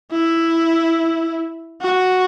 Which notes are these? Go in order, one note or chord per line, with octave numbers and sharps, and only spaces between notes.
E4
F#4